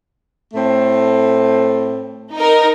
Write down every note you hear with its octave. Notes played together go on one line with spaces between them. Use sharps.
A2 A3 C4
D#4 A#4